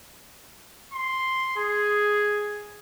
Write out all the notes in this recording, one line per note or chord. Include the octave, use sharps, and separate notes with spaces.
C6
G#4